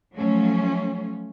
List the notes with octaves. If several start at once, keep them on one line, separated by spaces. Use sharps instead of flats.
F3 F#3 A3 C#4